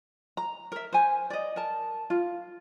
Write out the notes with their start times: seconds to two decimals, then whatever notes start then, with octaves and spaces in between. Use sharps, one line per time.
0.37 A#5
0.72 A#4 E5
0.93 C5 G#5
1.30 D5 D#5
1.56 A#4 A5
2.10 F4